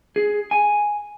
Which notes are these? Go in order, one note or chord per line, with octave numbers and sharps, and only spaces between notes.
G#4
G#5